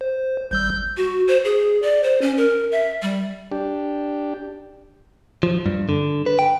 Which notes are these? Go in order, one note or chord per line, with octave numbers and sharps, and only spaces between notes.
C5
G#1 G3 E6 G6
F#4
C5
G#4
D5
C5
C#4
A#4
E5
G3
D4 G4
F3
G2
D3
B4
G5